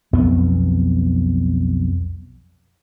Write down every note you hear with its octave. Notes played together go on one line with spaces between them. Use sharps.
B1 F2 B3